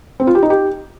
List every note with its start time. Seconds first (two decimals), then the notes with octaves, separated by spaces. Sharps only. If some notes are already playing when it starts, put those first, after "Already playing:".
0.20 C4
0.27 F4
0.35 G4
0.42 D#4
0.50 G4